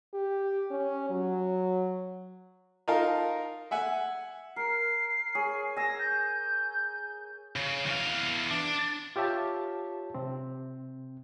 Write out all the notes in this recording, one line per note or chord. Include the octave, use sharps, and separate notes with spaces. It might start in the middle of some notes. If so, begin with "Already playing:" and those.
G4
C#4
F#3
D#4 F4 A#4 F5 A5
E5 F#5 G#5
A#4 C7
G#4 C#5
G#5 E6 A#6
G6
C#3
E2 F5
D4
F4 G4 C#5 E5 A5
C3 C4